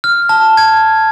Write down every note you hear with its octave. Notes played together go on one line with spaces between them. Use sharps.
F6
A5
G#6